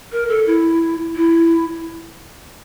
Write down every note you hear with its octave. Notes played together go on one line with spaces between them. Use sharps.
A#4
A4
E4
E4